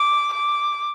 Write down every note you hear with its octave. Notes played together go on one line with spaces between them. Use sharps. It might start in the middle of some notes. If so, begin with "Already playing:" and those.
Already playing: D6
D6